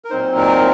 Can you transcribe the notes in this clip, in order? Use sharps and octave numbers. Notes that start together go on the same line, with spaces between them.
A#4
A#2 F#3 C4 D#4 C5
A#4